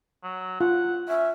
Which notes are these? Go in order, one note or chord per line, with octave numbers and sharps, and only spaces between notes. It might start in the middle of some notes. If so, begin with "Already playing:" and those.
F#3
F4 F#5
C#4 E5